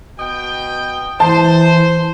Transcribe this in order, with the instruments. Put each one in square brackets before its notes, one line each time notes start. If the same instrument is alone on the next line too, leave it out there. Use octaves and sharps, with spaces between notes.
[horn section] B2 D#5 G5
[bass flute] E3 [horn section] C5 [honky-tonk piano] A5